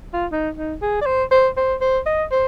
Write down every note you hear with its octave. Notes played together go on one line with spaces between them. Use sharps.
F4
D#4
D#4
G#4
D5
C5
C5
C5
C5
D#5
C5